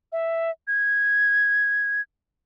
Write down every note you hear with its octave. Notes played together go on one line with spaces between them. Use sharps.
E5
G#6